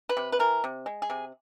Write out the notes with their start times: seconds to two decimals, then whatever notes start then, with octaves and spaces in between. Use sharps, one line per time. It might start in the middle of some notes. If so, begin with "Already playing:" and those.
0.09 B4
0.17 C3
0.32 B4
0.39 E3 A#4
0.64 C3
0.86 G#3
1.02 G#4
1.10 C3